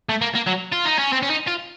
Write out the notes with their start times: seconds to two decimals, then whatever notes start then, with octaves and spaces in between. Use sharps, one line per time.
0.09 A3
0.22 A#3
0.35 A#3
0.47 F#3
0.73 F4
0.86 D#4
0.99 C#4
1.13 C4
1.23 C#4
1.30 D#4
1.48 F4